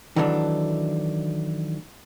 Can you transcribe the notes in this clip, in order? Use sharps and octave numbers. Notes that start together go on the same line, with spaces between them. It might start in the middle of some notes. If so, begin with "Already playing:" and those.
D#3 E3 F#3 A3 C#4 D4